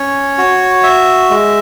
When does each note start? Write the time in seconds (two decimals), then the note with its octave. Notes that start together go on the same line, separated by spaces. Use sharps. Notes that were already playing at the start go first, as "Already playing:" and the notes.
Already playing: C#4 C#5
0.38 F#4
0.83 E5
1.30 G#3